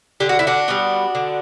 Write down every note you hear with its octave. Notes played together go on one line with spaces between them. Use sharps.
D3 G4
F#4
E4
D4 F#4
G3 B3
D3